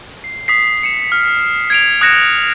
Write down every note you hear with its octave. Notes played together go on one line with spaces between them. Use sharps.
C7
D#6 B6 C7
C#7 E7
F6
G#6 D7 F7
D#6 F#6 G#6 A#6 C#7 E7